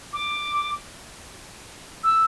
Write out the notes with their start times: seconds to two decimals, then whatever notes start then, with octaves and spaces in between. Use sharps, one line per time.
0.13 D6
2.04 E6